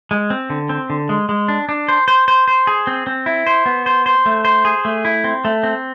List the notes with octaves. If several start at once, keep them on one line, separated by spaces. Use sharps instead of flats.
G#3
C4
D3
C4
D3
G#3
G#3
D4
D4
C5
C5
C5
C5
G#4
C4
C4
E4
C5
B3
C5
C5
A3
C5
G#4
A3
E4
C4
A3
C4